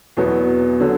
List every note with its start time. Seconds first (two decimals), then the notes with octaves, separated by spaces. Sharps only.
0.17 E2 B2 F#3 B3
0.80 D3 F#3